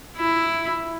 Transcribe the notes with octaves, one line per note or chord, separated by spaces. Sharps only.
E4